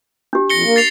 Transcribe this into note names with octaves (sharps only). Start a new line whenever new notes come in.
D4 G4
F2 A#6 C#7 G7
A#3
A6 C7 F7